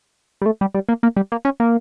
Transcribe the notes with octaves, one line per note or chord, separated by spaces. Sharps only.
G3
A3
G3
G3
A#3
A#3
G3
A#3
C#4
A#3